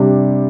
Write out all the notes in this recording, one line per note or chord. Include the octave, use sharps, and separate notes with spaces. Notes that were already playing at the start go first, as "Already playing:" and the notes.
Already playing: C3 G3 D4